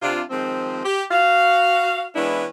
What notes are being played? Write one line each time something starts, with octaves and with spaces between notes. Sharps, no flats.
C3 D4 F4
D#3 F3 G#3 C4
G4
F#4 F5
E3 G#3 B3 C#4 D4 E4